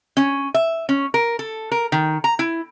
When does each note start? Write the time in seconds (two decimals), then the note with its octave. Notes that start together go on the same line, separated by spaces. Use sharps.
0.17 C#4
0.54 E5
0.89 C#4
1.14 A#4
1.39 A4
1.72 A#4
1.92 D#3
2.24 A#5
2.39 E4